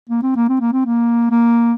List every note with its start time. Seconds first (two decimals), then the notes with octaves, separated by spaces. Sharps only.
0.09 A#3
0.23 C4
0.36 A#3
0.49 C4
0.61 A#3
0.73 C4
0.86 A#3
1.31 A#3